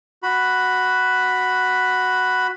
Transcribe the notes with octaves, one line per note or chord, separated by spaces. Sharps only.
F#4 B5